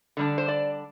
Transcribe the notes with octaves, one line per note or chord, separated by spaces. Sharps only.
D3 G3 D4
C5
D5